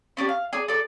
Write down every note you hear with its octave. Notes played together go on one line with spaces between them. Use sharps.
C#4 D4 G4 D5
F5
G#4 D5
A4 D5